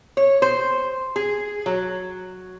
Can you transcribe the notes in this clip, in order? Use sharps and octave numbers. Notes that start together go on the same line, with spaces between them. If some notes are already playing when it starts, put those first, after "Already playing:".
C#5
C5
G#4
F#3